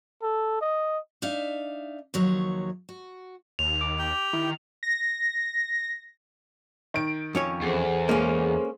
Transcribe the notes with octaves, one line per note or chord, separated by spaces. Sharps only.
A4
D#5
D4 D#4 E5 F5
D#2 F3 F#3 C#5
F#4
D#2 F7
D6
G4 G5
D#3 E4
A#6
D#3 D7
F2 C#4 C#5
E2 G#4 A4 C5
G#3 A#3 C#4